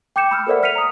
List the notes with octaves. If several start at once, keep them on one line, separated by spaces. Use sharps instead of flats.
G5 D6 G6 C#7 E7
B5 E6 F6
A4 A#4 C5 D5 E5 F#5
F6 B6 C#7 D#7 F7
A#5 D#6